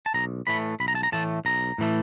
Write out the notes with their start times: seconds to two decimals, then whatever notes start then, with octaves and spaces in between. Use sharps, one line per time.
0.06 A5
0.14 B1 A#5
0.47 A2 E3 A3 B5
0.80 B1 B5
0.88 A#5
0.95 A5
1.03 A#5
1.12 A2 E3 A3 A5
1.45 B1 A#5
1.78 A2 E3 A3